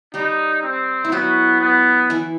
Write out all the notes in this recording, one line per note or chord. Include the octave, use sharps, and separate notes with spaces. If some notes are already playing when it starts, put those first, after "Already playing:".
G3 D#4 G4
C4
E4
F#3 B3 F#4
B3
E3 E4